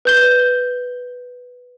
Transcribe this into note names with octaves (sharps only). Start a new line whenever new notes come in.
B4 G6 G7